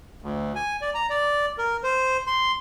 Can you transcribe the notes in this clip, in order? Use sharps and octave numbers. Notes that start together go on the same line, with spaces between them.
D2
G#5
D5
A#5
D5
A#4
C5
C6